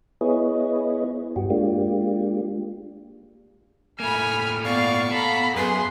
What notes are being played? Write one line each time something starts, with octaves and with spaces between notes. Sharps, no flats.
B3 E4 G#4 B4 C#5 D#5
G2 F#4 G4
G#3 A#3 D4 F4 G4
A2 A3 A#3 G#5 B5 F6
B3 D5 F5 C#6
A4 F5 A#5 B5
F#2 G#4 B4 C6